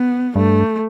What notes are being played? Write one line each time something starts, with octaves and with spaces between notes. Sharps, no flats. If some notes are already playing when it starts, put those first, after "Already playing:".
Already playing: B3
G2 A3